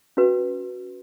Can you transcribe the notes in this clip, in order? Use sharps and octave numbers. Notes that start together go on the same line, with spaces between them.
C#4 F#4 B4